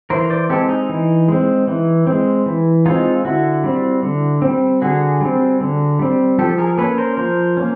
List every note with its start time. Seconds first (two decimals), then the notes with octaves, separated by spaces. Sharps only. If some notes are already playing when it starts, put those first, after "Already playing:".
0.10 E3 A#4 C5
0.30 C5 D5
0.49 G#3 C4 G4 A4
0.69 D#4
0.89 E3
1.28 G#3 C4
1.67 E3
2.07 G#3 C4
2.46 E3
2.86 G#3 C4 D#4 F4
3.25 D3 E4 F#4
3.64 G3 C4
4.03 D3
4.42 G3 C4
4.82 D3 F#4 G#4
5.21 G3 C4
5.61 D3
5.99 G3 C4
6.39 F3 G4 A4
6.58 G#4 A#4
6.78 A#3 C#4 A4 B4
6.98 A#4 C5
7.17 F3 A#4 C5
7.57 A#3 C#4